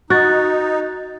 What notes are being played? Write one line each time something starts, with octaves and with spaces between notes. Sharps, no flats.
D#4 F#4 F#6 A6